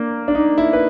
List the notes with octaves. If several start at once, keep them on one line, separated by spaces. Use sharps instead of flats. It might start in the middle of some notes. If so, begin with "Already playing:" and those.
Already playing: A#3 D4
D4
D#4
E4
B4